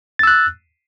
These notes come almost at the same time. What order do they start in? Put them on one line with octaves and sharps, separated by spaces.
A6 E6 F#6